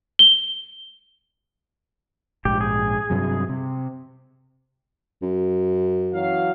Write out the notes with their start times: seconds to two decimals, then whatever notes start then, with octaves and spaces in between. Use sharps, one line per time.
0.19 G7
2.45 A#1 G#2 G4
2.61 G#4
3.10 G2 C3 F#3
3.49 C3
5.22 F#2
6.13 E3 F#3 F5